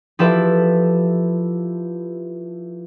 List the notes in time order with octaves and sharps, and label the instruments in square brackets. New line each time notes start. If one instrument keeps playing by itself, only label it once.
[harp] F3 E4 G4 A4 B4 E5